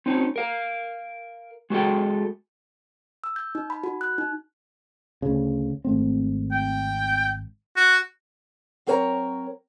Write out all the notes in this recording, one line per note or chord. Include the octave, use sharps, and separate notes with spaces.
C4 C#4 D#4
A#4 F5
G#3 F#4 G#4 A4 G5
E6
G6
D#4
B5
F#4
F#6
D#4
D2 C#3
G#1 A3 C4
G5
F#4
F#3 C4 A#4 C#5 A5 A#5